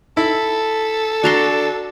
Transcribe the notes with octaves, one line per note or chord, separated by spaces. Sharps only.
E4 A4
D4 F#4 A#5 C6